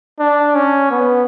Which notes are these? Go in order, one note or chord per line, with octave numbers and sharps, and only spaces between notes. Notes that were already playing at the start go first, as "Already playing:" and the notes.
D4
C#4
B3